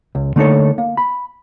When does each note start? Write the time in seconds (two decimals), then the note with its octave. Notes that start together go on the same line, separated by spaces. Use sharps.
0.15 C#2
0.36 D3 A3 A#3 D#4 A4 C#5
0.78 A#3
0.97 B5